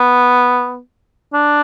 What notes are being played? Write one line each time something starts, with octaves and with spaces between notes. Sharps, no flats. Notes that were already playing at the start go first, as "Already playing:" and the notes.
Already playing: B3
D4